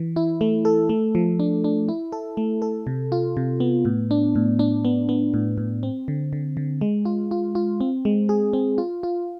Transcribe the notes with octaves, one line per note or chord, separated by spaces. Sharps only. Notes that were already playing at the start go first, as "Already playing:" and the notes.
Already playing: E3
E4
A3
A4
A3
F3
D4
D4
E4
A4
A3
A4
C3
F4
C3
B3
A2
D4
A2
D4
B3
B3
A2
A2
C4
D3
D3
D3
G#3
F4
F4
F4
C4
G#3
G#4
C4
F4
F4